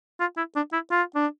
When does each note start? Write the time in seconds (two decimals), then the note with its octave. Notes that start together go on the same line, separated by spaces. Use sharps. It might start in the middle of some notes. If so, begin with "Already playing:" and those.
0.20 F4
0.37 E4
0.56 D4
0.73 E4
0.91 F4
1.15 D4